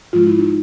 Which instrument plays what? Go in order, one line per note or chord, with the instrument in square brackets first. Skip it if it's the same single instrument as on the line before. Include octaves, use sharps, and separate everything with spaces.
[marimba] G#2 F3 G#3 F4
E4
D#4